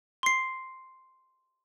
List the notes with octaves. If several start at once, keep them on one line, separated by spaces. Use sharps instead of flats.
C6 C7